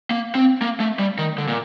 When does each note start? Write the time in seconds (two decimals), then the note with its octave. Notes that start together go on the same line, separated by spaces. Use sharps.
0.11 A#3
0.35 C4
0.62 A#3
0.80 A3
0.99 G3
1.18 D#3
1.38 D3
1.48 A#2